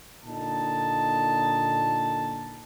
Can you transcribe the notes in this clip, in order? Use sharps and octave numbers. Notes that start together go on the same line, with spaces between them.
A#2 D3 D#4 A5